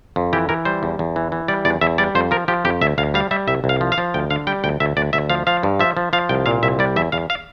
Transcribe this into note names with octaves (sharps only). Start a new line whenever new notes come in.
F2
E3 G4
E3 A#4
G3 C5
E2
E2
E3
E3
G3 D5
E2 D5
E2 E5
G3 D5
F2 C5
F3 A#4
F3 G4
F2 G4
D2 E5
D2 F5
G3 F5
G3 E5
C2 E5
C2
F5
F3
F5
F3
D2 G5
D3 F5
G3 G5
D2 G5
D2 E5
D2 D5
D2 E5
F3 F5
F3 F5
G2
F3 E5
F3
F3 F5
C2 G5
A#2 F5
C2 E5
G3 D5
E2 E5
E2 F5
F5